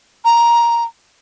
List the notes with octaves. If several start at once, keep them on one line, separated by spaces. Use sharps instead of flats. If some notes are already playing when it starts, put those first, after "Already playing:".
A#5